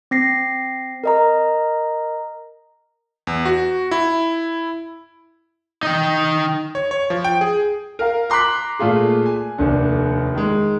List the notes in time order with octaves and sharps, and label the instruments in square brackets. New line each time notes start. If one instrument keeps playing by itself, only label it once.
[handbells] C4 A#6 C7
A#4 D#5 A#5
[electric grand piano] E2
F#4
E4
[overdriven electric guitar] D#4 G5
[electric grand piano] C#5
C#5
F3
G5
G#4
[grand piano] A#4 F5
A#5 C6 D6 F#6 B6
A#2 A3 F4 G#4
G#5
F1 D#2 D3
D#3 G#3